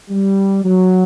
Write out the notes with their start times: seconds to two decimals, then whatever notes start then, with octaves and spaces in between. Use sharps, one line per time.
0.10 G3
0.64 F#3